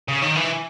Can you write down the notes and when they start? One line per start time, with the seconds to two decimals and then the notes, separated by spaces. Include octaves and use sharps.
0.08 C#3
0.22 D#3
0.36 E3